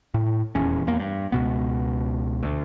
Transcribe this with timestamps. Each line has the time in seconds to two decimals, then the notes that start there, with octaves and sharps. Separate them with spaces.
0.14 A2
0.55 D#1 E2 C#4
0.87 E2 A#3
1.00 G2
1.32 C#2 B2 B3
2.43 D2